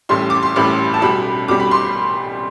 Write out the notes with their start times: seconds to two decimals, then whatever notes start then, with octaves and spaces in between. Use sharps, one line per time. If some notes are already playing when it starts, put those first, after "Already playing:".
0.09 A1 A2 G3 C6
0.30 D6
0.43 C6
0.56 A1 A2 G3 B5
0.94 A5
1.02 B1 B2 G3 B5
1.48 B1 B2 G3 D6
1.60 B5
1.71 C6